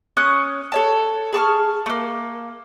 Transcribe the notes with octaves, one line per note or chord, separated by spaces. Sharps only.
C#4 C#5 D#6 F#6
A4 C#5 A5
G#4 A5 C#6 F6
A3 A#3